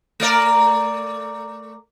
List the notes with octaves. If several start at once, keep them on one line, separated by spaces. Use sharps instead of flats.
A3 A#4 D5